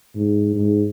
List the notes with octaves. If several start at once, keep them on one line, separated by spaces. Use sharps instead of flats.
G#2
G#2